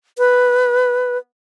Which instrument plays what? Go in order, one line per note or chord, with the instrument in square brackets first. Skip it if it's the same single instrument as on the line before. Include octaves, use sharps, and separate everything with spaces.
[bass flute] B4